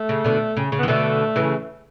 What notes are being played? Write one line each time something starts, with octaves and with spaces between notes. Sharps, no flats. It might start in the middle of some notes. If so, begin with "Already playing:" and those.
Already playing: A3
C#3
B2 D3
C#3
C#3
E3 B3
B2 D3 A3
C#3 E3